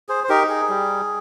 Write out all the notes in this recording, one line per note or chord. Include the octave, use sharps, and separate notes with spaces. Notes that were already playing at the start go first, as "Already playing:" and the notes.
G#4 C5
C5
D#4 G4 A#4
G#4
G3